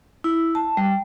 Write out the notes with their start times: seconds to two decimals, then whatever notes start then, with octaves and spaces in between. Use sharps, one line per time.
0.24 E4
0.55 A5
0.77 G3